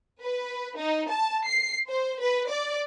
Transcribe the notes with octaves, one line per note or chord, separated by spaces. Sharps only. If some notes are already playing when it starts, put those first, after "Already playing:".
B4
D#4
A5
C7
C5
B4
D5